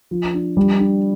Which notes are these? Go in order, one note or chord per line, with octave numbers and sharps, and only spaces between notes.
F3
D4
G3
D4